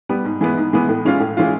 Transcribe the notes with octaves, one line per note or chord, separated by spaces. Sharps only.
G3 B3
G#2
E3 G#3 B3
G#2
E3 G#3 B3
A2
E3 G#3 C#4 F4
A2
E3 G#3 C#4 F4